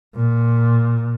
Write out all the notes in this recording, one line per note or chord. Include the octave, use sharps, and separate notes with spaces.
A#2